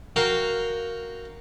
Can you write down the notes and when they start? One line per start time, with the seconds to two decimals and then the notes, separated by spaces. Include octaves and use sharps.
0.16 F#4 A#4 F5 G5